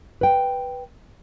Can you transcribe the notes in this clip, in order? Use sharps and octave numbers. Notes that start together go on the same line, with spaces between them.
B4 G5